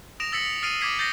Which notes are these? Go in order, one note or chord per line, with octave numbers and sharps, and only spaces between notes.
D#6 A#6 D7 E7 F7
E6 A6 B6 C#7 F#7
D#6
D#6 F6 A6 C7 D7 D#7
D6 D#6 G#6 B6 C7
G6 A6 A#6 C7 G7